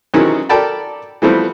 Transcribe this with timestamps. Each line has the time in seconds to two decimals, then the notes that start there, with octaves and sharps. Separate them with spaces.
0.14 C3 D#3 E3 F#3 C#4 G#4
0.49 A4 A#4 D5 G5 A5 B5
1.22 E3 F3 G3 A3 B3 C4